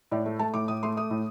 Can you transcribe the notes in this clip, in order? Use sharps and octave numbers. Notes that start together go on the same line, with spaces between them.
A2 D5
A3
A3 A5
A2 D6
A2 D#6
A3 C6
A3 D#6
A2